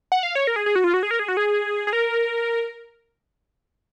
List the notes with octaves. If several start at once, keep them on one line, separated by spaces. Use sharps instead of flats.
F#5
F5
C#5
A#4
G#4
G#4
F#4
F4
F#4
G#4
A#4
G#4
F#4
G#4
G#4
A#4